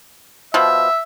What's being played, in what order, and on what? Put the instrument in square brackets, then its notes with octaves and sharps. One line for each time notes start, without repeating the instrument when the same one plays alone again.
[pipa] B2 F3 [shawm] E5